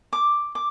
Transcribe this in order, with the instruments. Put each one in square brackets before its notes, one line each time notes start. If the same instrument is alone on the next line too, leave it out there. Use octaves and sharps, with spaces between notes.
[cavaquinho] D6
D6